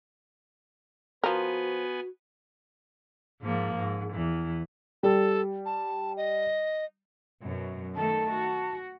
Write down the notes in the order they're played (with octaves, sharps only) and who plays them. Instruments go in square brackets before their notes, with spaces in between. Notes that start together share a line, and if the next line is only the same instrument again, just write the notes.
[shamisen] F3 A#4 [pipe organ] B3 B4 G#5 [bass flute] F#4
[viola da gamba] G#2 F3 A#3
G#2
E2 E3
[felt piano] G3 [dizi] A4
[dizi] A5
D#5
[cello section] F#2 B2
[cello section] D#3 A3 A4 [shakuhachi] A5
[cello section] F#4